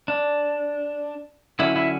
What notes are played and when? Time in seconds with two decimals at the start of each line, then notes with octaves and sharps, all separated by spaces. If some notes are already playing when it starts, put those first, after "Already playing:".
0.08 D4
1.59 D3 F#3 C#4 E4
1.76 E4